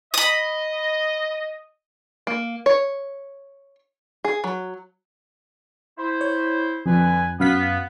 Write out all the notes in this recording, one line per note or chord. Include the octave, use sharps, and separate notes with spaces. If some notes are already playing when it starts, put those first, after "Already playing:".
D#5 B5 D#6
A#3
C#5
G#4
F#3
E4 C5
C#5
F2 D3 B4 G#5
F#2 B3 F5 B6